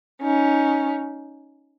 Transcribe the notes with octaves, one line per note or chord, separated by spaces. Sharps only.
C#4 D#4